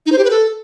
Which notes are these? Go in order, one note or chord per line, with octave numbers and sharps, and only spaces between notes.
D#4
C5
G4
B4
A4